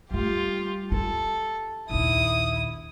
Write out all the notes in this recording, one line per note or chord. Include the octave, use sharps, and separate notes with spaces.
G3 A3 F4 G4
F4 A4
A#1 D#2 E4 D#6